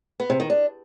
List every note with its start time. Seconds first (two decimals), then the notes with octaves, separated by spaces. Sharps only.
0.20 B3
0.30 C3
0.40 D#3
0.50 D4